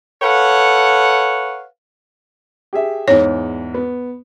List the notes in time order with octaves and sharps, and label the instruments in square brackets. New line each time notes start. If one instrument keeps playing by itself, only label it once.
[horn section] A4 B4 C#5 F5 F#5
[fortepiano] G4 G#4 E5
[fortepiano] E2 G#2 [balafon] C#5
[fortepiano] B3